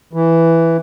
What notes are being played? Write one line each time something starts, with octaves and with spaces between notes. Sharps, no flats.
E3